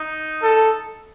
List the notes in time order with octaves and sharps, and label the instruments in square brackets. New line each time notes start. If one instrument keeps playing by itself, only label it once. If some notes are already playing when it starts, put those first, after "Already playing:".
Already playing: [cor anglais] D#4
[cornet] A4